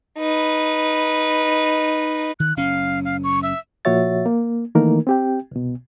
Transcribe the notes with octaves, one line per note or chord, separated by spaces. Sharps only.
D#4 B4
D#3 F#6
F#1 C#4 F5
F5
C#6
E5
A#2 F3 F#4 C#5 E5 A6
A#3
D#3 E3 A3 A#3 D#4 A#4
C4 G4 G5
C2 B2